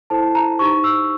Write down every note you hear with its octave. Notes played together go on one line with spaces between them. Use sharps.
E4 A4 C5 A5
A#5
D#4 G4 C5 C#6
E6